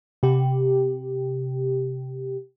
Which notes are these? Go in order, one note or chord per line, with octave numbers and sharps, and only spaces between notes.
C3 G4